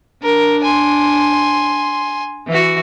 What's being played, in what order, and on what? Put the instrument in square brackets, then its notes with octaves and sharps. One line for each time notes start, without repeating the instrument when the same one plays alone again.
[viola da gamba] D4 [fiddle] A#4
[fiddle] G#5 C6
[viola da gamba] E3 F#4